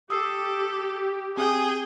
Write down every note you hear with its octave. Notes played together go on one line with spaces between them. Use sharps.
G4 A4 D#6 E6 C7
C4 G#4 G5 D#6